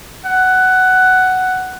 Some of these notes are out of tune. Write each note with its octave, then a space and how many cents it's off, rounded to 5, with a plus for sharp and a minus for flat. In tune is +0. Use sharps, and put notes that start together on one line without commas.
F#5 +10